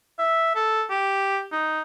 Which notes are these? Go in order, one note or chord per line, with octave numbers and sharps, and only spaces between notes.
E5
A4
G4
D#4